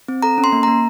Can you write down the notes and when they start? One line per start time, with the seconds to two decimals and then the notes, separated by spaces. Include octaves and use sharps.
0.08 C4
0.22 A4 A#5
0.38 C#4
0.44 C6
0.52 A#3
0.63 A#5
0.68 A#3